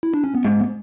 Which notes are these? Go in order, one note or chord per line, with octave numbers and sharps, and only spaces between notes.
E4
D4
C#4
B3
G#2 A3
B3